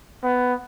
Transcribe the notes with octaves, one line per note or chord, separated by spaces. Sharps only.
B3